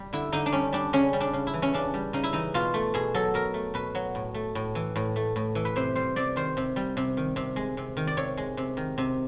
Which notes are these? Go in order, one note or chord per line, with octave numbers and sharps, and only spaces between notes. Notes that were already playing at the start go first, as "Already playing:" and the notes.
Already playing: G3
D3 E4
D3 D#4
D4
G3 C#4
G3 D4
C#3 C#4
G3
D4
C#3
E4
E3
C#4
C#3 D4
G3
C#3 D#4
E4
E3 D#4
B2 F4
A3
B2 G#4
F#3 A4
B2 A#4
A3
B2 B4
F#3
A2
A3
A2
E3
A2
A3
A2
E3
B4
C3 C5
G3 C5
C3 D5
D#3 C5
C3
G3
C3
D#3
C3
G#3
C3
D#3
D5
C3 C#5
G#3
C3
D#3
C3